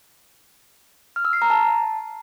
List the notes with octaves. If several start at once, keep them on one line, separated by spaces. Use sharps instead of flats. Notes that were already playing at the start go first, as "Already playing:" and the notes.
F6
E6
C7
A#5
A5